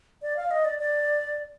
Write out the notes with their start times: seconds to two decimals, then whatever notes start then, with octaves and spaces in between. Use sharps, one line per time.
0.22 D5
0.37 F5
0.51 D#5
0.65 D5
0.79 D5